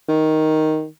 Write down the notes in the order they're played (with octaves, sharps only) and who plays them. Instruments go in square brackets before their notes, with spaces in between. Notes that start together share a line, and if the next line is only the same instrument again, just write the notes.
[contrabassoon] D#3